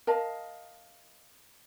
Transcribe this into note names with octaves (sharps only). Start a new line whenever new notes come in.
A#4 D#5 F5 A5